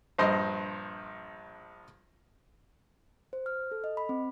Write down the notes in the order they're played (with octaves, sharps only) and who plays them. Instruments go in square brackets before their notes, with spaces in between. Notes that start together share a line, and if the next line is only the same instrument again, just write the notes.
[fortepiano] A#1 G2 C5 D#5 C6
[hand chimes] C5
F6
A4
D#5
B5
C4